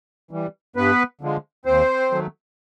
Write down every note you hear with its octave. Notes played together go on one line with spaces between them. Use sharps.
E3 G3
G2 B3 B4
D3 F3 G#3
D#2 C4 C5
D#3 F#3 A3